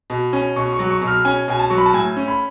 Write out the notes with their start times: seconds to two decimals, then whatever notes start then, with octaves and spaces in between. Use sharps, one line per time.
0.10 B2
0.33 C#4
0.56 B2 C#6
0.73 C#6
0.79 F#3
0.90 C#6
1.02 B2
1.08 F6
1.25 C#4 G#5
1.48 B2 G#5
1.59 A5
1.70 F#3 C#6
1.78 B5
1.86 A5
1.94 A2 G#5
2.17 C#4
2.28 B5